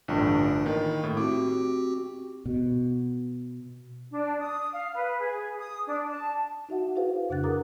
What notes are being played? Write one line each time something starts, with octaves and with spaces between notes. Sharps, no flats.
A1 G2 D3 D4 F4 G5
D#3 A#3 E4
A2
C4 F#4 G4 D6
B2
D4
D#6
F5
B4
G#4
D#6
D4
A5
D#4 F#4 E5 F#5
E4 F#4 G#4 B4 C5 F5
F2 C#3 D4 F#5 F#6 A6
G#4 A#4 A#5 D6 D#6